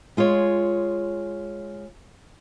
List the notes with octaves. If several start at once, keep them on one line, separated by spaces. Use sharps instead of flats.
G#3 F4 G#4 C#5